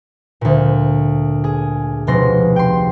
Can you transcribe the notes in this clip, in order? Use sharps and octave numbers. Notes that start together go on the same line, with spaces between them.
D2 A#2
G#4
F1 B2 G#3 C6 A#6
G5 C6